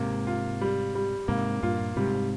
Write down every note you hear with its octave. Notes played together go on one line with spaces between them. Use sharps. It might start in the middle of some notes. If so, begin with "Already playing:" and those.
Already playing: G#2 C3 A#3
F4
G3
G3
G#2 C3 A#3
G2 A#2 F4
G#2 C3 G3